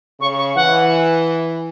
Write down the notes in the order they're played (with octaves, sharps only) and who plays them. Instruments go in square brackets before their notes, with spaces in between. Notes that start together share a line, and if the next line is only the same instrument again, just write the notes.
[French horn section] C#3 [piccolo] C#6
[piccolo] C#6
[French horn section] E3 [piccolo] F#5